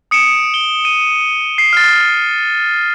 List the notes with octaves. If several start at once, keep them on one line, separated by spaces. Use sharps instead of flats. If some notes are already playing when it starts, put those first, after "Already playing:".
D#6 C#7 D7 E7
G7
D#7
C7
F6 A6